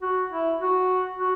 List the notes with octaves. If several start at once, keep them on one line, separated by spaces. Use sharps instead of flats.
F#4
E4
F#4
F#4